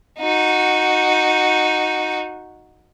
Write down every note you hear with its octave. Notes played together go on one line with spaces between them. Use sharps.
D#4 F#4